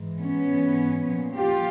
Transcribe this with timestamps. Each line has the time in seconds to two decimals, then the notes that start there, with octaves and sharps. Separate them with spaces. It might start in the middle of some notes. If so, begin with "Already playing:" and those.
Already playing: G#2 E3
0.20 B3 C#4
0.48 G#2 E3
1.06 A#2 F3
1.35 F4 G4